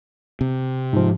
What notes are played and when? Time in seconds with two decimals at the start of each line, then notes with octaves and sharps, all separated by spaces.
0.41 C3
0.93 G#2 F3